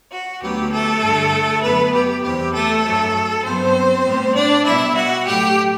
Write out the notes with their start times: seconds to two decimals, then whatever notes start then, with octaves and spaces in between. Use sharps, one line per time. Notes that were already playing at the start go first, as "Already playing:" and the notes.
0.12 F#4
0.42 D2 D3 F#3 B3 G4
0.72 A3 A4
1.02 G2 D3 G3
1.63 F#2 D3 A3 B3 B4
1.93 G4
2.24 E2 C3 G3 G4
2.54 A3 A4
2.84 G2 F#3 A3
3.45 G2 F#3 B3 C4 C5
4.05 A2 G3 B3
4.36 D4 D5
4.66 B2 G3 B3 E4 E5
4.96 F#4 F#5
5.26 A2 F#3 A3 G4 G5